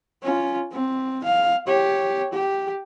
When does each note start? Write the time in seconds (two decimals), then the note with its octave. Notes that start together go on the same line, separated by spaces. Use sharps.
0.23 C#4 F4
0.73 C4
1.24 F5
1.67 G4 C#5
2.33 G4